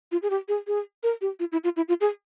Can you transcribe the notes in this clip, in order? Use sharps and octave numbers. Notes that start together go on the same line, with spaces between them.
F4
G#4
G4
G#4
G#4
A#4
G4
F4
E4
F4
E4
F4
G#4